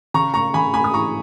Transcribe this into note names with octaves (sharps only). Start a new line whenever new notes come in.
C#3 A#5 C#6
A#5 C#6
C#3 G#5 B5
G#5 B5
D#6
E3 A#5 C#6